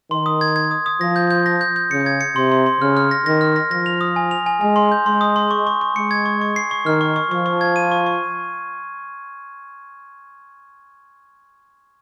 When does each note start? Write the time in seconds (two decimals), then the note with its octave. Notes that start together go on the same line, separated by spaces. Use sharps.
0.11 D#3 C6
0.26 D#6
0.41 G#6
0.56 G#6
0.71 D#6
0.86 D#6
1.01 F3 A#6
1.16 G6
1.31 G6
1.46 A#6
1.61 G6
1.76 G6
1.91 C#3 C#7
2.06 G#6
2.21 C#7
2.36 C3 C6
2.52 C6
2.66 C6
2.81 C#3 F6
2.97 F6
3.11 A#6
3.26 D#3 A#6
3.41 F6
3.56 A#6
3.71 F3 A#6
3.86 F7
4.01 D#6
4.16 G#5
4.31 F7
4.46 G#5
4.61 G#3 G#5
4.76 C6
4.92 G6
5.06 G#3 C6
5.21 D#6
5.36 C6
5.51 C#6
5.67 C#6
5.81 C#6
5.96 G#3 C#7
6.11 G#6
6.26 C#6
6.41 C#6
6.56 C7
6.71 C#6
6.86 D#3 F6
7.01 C#6
7.16 C#6
7.31 F3 C#6
7.46 C#6
7.61 G#6
7.76 D#7
7.91 C#6
8.06 C#6